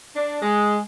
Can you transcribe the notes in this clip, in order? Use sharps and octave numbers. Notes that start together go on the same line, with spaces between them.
D4
G#3